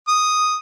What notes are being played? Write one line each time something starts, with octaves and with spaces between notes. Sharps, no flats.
D#6